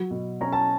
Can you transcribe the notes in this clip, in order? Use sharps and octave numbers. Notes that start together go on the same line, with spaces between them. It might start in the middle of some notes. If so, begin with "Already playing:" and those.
Already playing: F#3
B2
C#4 A#5
A5